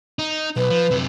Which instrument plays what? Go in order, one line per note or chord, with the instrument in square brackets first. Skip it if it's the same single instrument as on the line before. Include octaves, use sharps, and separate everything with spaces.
[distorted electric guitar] D#4
[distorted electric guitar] B1 [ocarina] B4
[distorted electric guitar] F3
F#2 C3